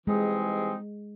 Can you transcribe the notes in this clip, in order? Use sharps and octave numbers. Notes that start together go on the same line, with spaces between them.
E3 G3 G#3 C4 D#4 G#4